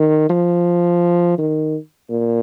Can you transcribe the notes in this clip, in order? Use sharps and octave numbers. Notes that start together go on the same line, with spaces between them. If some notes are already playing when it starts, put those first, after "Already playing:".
Already playing: D#3
F3
D#3
A#2